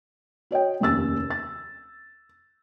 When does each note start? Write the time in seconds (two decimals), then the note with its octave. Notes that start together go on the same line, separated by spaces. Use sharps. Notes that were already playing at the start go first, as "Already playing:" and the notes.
0.51 F#4 C#5 D#5 G5
0.80 F1 D#2 C#4 E6 A6
1.30 A6